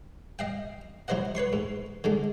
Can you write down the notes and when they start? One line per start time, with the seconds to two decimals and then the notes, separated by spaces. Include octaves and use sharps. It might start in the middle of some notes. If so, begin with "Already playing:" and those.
0.39 D#5 F5 G5
1.08 F#3 E4 C5 D#5 F#5
1.35 B4 C#5 C6 C#6
1.53 G#2
2.04 D3 G#3 D4